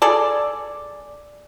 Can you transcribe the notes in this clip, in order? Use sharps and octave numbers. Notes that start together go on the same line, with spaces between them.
G#4 A4 D5